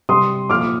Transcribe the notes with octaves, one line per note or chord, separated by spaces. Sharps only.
C3 G3 C6 D#6
A#2 F3 D6 F6
D6